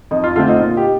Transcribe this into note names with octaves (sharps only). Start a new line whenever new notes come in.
F2 D#4
F4
D3 A3 C4 F4
D#4
A#2 F4
D#4 G4